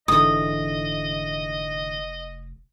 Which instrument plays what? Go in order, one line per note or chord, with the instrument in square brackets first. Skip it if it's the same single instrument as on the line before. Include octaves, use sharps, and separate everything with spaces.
[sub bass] F1 [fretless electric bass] G#2 D3 E3 [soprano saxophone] D#5 [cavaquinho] D#6